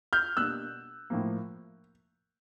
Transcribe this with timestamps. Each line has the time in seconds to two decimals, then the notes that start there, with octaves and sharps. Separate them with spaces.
0.13 F6 G6
0.37 B2 G3 A#3 D4 E6 F#6
1.10 A2 F3 A#3